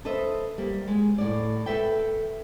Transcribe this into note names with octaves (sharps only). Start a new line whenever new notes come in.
A4 B4 C5 D#5 E5
G3 A#3
G#3
A2 D5
A4 B4 E5 G5